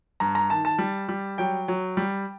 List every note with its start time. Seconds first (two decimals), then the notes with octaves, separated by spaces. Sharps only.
0.20 G2 A#5
0.35 A#5
0.50 D#3 A5
0.65 A5
0.78 G3
1.09 G3
1.38 F#3 G5
1.68 F#3
1.97 G3